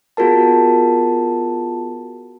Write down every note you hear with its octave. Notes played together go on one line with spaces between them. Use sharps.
B3 F4 F#4 G#4 A#4 A5